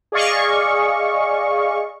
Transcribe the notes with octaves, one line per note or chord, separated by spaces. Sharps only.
G#4 D5 D#5 F5 C#6